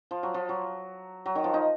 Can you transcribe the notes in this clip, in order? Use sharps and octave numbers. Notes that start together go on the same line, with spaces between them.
F3
F#3
F3
F#3
F#3
D#3
F3
D#4